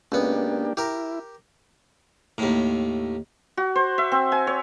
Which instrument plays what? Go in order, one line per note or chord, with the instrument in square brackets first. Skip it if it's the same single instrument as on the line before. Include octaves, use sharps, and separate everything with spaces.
[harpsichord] C#2 B3 [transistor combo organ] A#3 D4 G4
[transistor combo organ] E4 [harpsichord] G4 A#4
[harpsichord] D#2 A2
[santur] F#4
C5
E5
C4
G#5
C#5